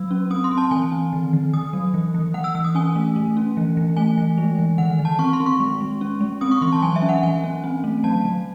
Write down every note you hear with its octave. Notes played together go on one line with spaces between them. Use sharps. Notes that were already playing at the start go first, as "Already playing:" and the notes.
Already playing: F#3 E6
C#4
C4 D#6
C6
C4
A5
E3 G#5
C4
D#3
D#3
D#3 D#6
F#3
E3
E3
E3 F#5
E6
E3 E6
D#6
C#4 G#5
A3
A3
C#4
E3
E3
A3 G#5
E3
G#3
E3
D#3 F#5
D#3
A5
C4 C#6
C6
C4
C#6
G#3
G#3
C#4
G#3
C4 D#6
C#6
E3 C6
A5
F#3 G#5
E5
C#4
F#5
E3 G#5
C#4
C4
A3
F#3 A5
F#3